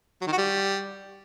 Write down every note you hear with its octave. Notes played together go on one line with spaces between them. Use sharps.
F#3
D#3
F#4
G3